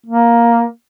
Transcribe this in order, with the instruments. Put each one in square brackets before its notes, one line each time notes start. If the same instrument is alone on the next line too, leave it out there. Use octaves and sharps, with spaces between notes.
[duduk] A#3